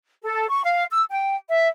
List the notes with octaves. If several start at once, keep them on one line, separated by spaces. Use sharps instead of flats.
A4
C#6
F5
E6
G5
E5